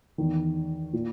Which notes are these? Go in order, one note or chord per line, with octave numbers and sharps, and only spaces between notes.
E2 D#3
A#2